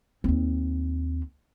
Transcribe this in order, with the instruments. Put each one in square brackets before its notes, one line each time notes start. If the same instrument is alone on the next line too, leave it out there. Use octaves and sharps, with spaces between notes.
[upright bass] D#2 C4